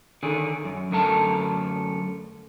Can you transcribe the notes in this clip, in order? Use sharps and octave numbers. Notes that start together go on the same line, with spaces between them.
D3 D#3 G#4
F#2
F#2 D3 A3 A#4 A5